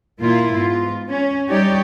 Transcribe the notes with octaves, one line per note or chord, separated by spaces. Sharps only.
A#2 A#3 E4 F4
G#2 B3 F4
C#4
G3 D#4 G4 C#5 D5